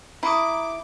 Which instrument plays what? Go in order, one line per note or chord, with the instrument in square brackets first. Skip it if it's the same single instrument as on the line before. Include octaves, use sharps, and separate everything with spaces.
[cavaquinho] E4 [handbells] A#5 B5 D#6 [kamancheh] D6